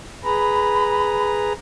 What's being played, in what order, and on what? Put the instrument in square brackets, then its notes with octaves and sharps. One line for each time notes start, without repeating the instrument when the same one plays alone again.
[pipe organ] G#4 B4 A#5 [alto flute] B5